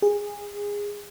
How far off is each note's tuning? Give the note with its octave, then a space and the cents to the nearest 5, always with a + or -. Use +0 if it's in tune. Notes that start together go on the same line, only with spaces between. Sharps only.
G#4 -20